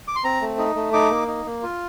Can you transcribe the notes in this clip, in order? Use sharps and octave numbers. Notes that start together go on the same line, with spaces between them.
D6
C6
C4 A#5
A3
D#4
A3
D#4 D6
A#3
D#4
A#3
F4